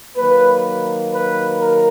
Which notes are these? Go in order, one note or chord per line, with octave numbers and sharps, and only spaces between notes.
D#3 F#3 A#3 B4
B4
A#4